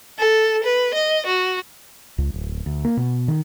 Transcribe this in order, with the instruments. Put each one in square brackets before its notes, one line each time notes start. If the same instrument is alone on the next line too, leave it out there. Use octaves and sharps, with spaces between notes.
[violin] A4
B4
D#5
F#4
[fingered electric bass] C#2
D1
D2
A#3
B2
D#3